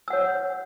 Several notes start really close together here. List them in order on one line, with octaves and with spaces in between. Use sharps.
E6 F#5 C#5